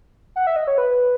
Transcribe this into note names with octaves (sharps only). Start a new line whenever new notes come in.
F#5
E5
D#5
C#5
B4